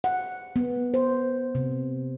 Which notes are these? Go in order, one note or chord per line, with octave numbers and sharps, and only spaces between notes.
F#5
B3
C5
C3